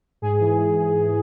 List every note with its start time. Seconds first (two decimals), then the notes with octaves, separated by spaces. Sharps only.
0.22 G#2 G#4
0.40 E3